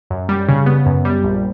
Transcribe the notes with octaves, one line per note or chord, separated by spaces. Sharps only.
F#2
G3
C#3
B3
F#2
G3
A#1